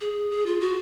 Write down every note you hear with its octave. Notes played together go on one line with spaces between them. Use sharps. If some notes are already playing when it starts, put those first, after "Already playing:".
G#4
G#4
F4
F#4